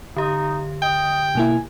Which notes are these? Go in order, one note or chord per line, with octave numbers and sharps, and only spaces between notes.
D3 D#4 G4
D#5 G5
B2 A#3 E4 G#5